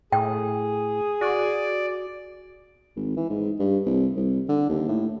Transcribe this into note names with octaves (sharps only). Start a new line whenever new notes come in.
A2 G#4 G5
F#4 D5
G#1
E3
G#2
G2
C2
C2
D3
D#2
A2